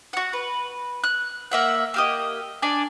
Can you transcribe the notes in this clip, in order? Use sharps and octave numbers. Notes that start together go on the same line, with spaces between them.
F#4 F#5
B4
F#6
A#3 E5 F#5
A#3 G4 D#5
D4 D5 G#5